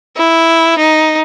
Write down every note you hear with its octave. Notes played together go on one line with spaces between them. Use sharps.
E4
D#4